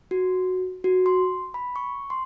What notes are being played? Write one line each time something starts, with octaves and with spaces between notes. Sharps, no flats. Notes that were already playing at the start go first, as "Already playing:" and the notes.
F#4
F#4
C6
B5
C#6
C6